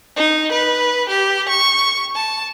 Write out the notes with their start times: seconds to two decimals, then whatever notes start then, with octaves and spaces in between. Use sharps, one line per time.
0.16 D#4
0.52 B4
1.09 G4
1.49 C#6
2.15 A5